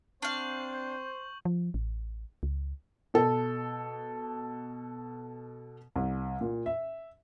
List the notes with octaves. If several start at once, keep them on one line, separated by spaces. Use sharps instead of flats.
C4 D4 C5 F5 C#6 G6 F#7
F3
A1
C#2
B2 A4
C2
A#2
E5